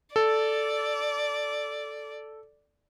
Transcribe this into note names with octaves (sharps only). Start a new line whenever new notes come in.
A4 D5